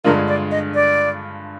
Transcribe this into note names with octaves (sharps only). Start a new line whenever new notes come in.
G2 D3 G#3 D4 F4 A#4
D5
D#5
D5